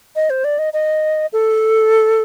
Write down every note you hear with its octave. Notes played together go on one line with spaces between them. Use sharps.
D#5
C5
D5
D#5
D#5
A4